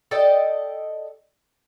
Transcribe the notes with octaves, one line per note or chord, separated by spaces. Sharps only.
A4 D5 D#5 G5